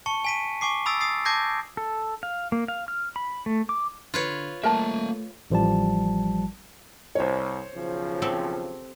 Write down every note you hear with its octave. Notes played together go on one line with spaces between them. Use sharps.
A5 C#6 C#7
G#5 B6 D#7
G#5 C#6 D6 C7
B5 D#6 E6 A6 D7
D#6 A6 C7
A5 D6 G6 G#6 A#6 C7
A4
F5
A#3
F5
F6
B5
A3
D6
D3 F4 B4 C#5
A3 A#3 A#4 E5 A5
A1 F3 G3 A5
C2 C5 C#5
B1 C#3 F3
C4 G4 A4